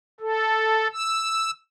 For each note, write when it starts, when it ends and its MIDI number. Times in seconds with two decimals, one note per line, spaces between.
0.20 0.87 69
0.93 1.51 88